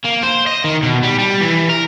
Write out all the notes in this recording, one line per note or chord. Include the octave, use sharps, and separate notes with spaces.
A#3
C5
D#5
D#3
B2
G3
G3
E3
A#4